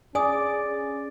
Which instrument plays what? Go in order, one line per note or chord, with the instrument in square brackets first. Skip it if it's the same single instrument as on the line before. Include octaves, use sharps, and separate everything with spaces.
[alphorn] C#4 [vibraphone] G#4 [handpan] D5 [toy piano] G#5 D#6